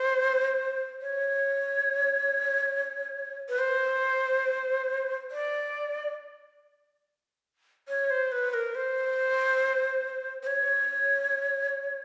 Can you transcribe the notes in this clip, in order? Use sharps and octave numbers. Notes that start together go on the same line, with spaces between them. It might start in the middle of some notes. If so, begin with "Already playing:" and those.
Already playing: C5
C#5
B4
C5
D5
C#5
C5
B4
A#4
C5
C5
C#5